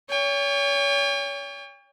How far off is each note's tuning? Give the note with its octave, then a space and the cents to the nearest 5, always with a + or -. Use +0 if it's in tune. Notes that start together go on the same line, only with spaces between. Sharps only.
C#5 +30 G5 +45